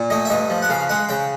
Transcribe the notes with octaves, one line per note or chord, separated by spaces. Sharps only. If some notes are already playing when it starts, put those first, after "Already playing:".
Already playing: A#2
A3 D#5
E5
G2 D#5
F3
F#5
C#3 F5
G#3 F#5
C#3 G5